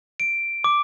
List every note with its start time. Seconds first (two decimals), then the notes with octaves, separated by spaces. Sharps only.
0.20 D7
0.64 D6